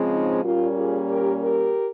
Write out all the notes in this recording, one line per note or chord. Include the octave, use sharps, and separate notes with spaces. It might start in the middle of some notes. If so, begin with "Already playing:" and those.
Already playing: C#3 F3 G#3 C4
D#4
A#2 G3 A#3 C#4 F4
F4 G#4
G4 A#4
G4 A#4